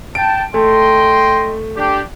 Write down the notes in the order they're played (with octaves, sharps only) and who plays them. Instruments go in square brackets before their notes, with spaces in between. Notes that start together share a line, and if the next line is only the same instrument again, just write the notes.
[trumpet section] G5 A5 [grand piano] D7
[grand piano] A3 [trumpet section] D#5 G5 C6
[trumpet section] D4 G4